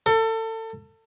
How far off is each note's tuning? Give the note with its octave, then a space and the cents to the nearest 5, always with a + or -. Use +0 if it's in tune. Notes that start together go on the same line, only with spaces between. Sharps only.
A4 +30